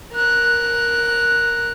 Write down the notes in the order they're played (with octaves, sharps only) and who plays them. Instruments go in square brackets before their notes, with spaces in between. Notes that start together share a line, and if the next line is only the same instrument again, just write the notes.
[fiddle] A#4 F#6